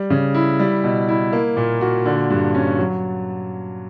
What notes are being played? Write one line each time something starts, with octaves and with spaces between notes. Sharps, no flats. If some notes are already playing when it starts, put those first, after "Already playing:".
Already playing: G3
C#3
E4
G3
B2
E4
A#3
A#2
F#4
D3
G2
C#4
F#3